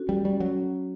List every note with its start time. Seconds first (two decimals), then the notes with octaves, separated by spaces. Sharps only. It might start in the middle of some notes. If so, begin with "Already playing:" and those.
Already playing: C#4 F#4 A4
0.09 G3
0.25 G3 C#4
0.40 F#3
0.56 C#4